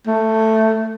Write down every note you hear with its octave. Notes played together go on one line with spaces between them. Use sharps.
A3